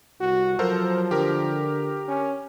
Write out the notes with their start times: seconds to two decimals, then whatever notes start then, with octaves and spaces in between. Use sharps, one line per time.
0.21 C2 F#4
0.59 F3 F#3 A4 A#4 C5
1.11 D3 G4 A#4
2.08 C#4